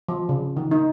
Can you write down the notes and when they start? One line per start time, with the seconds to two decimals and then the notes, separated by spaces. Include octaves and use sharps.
0.08 F3
0.29 C#3
0.57 D#3
0.71 D#4